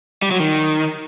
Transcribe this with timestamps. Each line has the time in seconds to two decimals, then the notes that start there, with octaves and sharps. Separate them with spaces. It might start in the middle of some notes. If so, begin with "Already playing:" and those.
0.22 G3
0.31 F#3
0.40 D#3